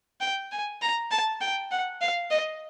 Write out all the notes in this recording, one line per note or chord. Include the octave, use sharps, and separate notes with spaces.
G5
G#5
A#5
A5
G5
F#5
F5
D#5